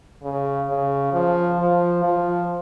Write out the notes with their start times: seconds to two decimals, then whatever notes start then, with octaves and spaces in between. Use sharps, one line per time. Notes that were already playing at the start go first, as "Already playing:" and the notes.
0.23 C#3
0.70 C#3
1.14 F3
1.59 F3
2.03 F3